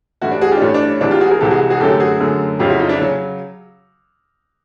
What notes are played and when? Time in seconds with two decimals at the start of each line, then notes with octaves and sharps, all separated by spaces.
0.21 G2 E3 A3 E4 F#4
0.31 D4
0.41 F#4 G#4
0.52 F4 G4
0.57 D4
0.61 G2 E3 A3 C#4
0.74 D4
0.88 C#4
1.01 C2 C3 E3 G#3 D4
1.11 F4 G4
1.20 F#4 G#4
1.31 G#4 A#4
1.40 C2 C3 E3 G#3 G4 A4
1.51 F#4 G#4
1.70 F#4 G#4
1.80 F#2 D3 F#3 A3 G4 A4
2.00 F#4 G#4
2.20 F#2 D3 F#3 A3
2.59 F2 C#3 F#3 F4 G4
2.69 E4 F#4
2.79 D#4 F4
2.89 D4 E4
2.99 C#3 F#3 C#4